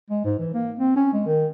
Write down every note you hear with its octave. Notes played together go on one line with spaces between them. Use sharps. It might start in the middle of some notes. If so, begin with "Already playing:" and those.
G#3
G#2
E3
A#3
C4
C#4
G#3
D#3